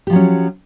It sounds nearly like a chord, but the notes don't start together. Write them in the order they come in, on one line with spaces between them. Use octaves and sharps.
G4 F3 F#3 C#4